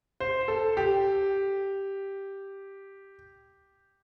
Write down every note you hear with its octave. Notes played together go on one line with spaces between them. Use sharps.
C5
A4
G4